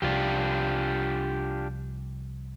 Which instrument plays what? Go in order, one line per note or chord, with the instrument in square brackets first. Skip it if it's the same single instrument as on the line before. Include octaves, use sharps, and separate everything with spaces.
[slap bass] C2 F3 [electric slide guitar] D4 F4 G4